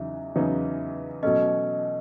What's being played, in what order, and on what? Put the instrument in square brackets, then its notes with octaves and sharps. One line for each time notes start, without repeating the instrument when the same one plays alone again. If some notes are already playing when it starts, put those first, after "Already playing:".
Already playing: [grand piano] E2 C#3 F#3 D#4 [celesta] E5
[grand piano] E2 C#3 F#3 B3 D#4
[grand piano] B2 F#3 A3 C#4 [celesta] D#5